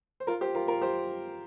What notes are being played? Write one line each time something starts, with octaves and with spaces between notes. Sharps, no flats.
C5
F4 A#4
G4 C5
F4 A#4
F4 A#4
G4 C5